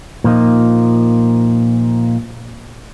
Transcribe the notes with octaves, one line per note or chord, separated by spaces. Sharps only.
A#2 F3 A#3 D#4